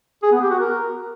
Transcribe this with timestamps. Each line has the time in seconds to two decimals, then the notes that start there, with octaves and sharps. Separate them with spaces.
0.23 G#4
0.32 B3
0.41 G4
0.50 F#4
0.59 A#4